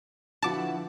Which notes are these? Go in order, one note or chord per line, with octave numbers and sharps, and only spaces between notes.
D3 F3 E4 F#4 B4 A5 D6